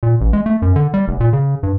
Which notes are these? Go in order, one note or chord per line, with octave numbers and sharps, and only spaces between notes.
A#2
A1
G#3
A3
F#2
D3
G3
F1
A#2
C#3
G2